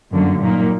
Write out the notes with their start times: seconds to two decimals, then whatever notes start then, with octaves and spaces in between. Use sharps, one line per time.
0.11 G1 F#2 D3 F#3 A#3
0.40 A#2 F#3 A#3 D#4